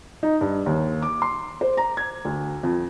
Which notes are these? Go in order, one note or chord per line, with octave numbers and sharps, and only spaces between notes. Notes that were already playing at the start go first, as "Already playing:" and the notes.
D#4
G2
D#2
D6
C6
C5
A#5
G#6
D2
F2